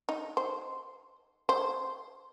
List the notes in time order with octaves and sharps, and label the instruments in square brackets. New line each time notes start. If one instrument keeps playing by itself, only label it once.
[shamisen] D#4
C5
C5